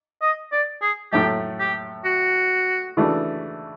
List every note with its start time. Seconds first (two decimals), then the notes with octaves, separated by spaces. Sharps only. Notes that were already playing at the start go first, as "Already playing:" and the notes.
0.21 D#5
0.52 D5
0.82 G#4
1.12 A2 F#3 A3 G4
1.59 G4
2.05 F#4
2.97 C#3 E3 A3 D4 F#4